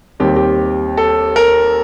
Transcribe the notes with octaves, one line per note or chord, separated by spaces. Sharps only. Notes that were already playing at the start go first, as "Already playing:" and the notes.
D#2 D#3 G3 C4 G4
G4
A4
A#4